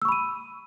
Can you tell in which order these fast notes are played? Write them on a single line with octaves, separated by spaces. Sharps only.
E6 C#6 B5 D#7